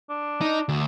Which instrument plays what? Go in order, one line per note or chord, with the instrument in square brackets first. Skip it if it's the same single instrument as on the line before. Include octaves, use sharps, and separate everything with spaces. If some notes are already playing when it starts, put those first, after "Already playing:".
[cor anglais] D4
[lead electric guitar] D#4
D2